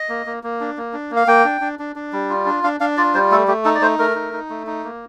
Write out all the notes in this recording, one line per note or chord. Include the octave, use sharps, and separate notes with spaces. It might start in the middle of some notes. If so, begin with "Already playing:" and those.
Already playing: D#5
A#3
A#3
A#3
D4
A#3
D4
A#3
F5
A#3 G5
D4
D4
D4
D4
G3
F4
D4
D4 F5
D4 F5
F4 D5
G3 C5
A3 A4
A3 G4
D#4 A4
D5
A3 C5
A3 A#4
D#4
D#4
A3
D#4
A#3